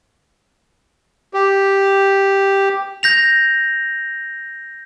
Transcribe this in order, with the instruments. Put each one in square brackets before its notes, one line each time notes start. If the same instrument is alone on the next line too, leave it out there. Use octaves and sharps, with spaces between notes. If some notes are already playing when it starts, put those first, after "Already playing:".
[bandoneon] G4
[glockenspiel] G6 A#6 F7